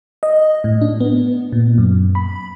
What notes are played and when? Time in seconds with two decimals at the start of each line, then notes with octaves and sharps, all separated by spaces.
0.23 D#5
0.64 A2
0.81 D4
1.00 B3
1.52 A#2
1.78 F#2
2.15 B5